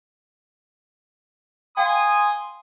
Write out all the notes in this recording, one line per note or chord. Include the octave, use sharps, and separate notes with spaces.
F5 G5 G#5 C6 D#6